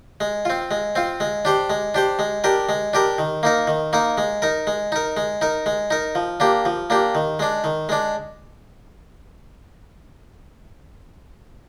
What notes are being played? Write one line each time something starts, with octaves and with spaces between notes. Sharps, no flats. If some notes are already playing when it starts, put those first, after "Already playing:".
G#3
C4 F4
G#3
C4 F4
G#3
D4 G4 C5
G#3
D4 G4 C5
G#3
D4 G4 A#4
G#3
D4 G4 A#4
D#3
A#3 D#4 A#4
D#3
A#3 D#4 A#4
G#3
D#4 A#4
G#3
D#4 A#4
G#3
D#4 A#4
G#3
D#4 A#4
F3
A#3 D4 G4
F3
A#3 D4 G4
D#3
G#3 D4
D#3
G#3 D4